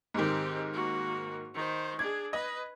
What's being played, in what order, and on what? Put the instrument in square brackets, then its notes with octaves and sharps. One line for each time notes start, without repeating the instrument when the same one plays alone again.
[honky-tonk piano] G#2 D#3 [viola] C4 G4
[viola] A#3 F#4
D#3 C5
[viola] D4 G#4 [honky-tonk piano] G#6
[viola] B4 [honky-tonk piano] D#5